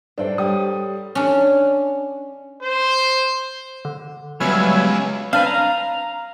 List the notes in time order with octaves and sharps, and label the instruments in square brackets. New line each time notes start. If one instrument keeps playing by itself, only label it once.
[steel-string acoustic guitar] G2 G5 [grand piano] D4 [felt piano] A4 C5 D5
[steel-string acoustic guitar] G3 C#5 [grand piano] G5 D#6
[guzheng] C#4 D4
[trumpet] C5
[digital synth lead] D3
[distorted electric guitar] C#2 [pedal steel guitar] F#3 G3 [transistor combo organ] B3 E5 G#5 [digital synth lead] F6
[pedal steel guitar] C4 D4 B4 [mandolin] F5
[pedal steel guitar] A#5